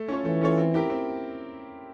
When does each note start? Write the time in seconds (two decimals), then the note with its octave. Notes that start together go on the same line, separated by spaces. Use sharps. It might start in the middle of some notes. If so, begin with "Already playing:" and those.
Already playing: A3
0.08 C#4 F4 A4 C#5
0.25 E3 A3
0.41 C#4 F4 A4 C#5
0.58 C4
0.74 E4 G4 A#4
0.90 C4